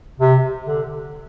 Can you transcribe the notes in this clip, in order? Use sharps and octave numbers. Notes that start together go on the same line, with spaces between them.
C3
D3